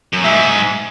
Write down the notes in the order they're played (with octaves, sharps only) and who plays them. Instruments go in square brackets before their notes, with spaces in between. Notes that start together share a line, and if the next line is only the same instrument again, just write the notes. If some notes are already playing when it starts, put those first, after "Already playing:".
[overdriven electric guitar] F#2
[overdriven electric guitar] G#2 [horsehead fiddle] E5